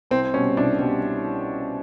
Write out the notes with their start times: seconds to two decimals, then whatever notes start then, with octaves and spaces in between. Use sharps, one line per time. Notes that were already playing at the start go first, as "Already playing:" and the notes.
0.11 C2 C4
0.34 B2 G3 C#4
0.57 C2 D4
0.79 B2 G3